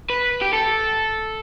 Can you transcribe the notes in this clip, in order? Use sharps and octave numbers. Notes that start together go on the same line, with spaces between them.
B4
G4
A4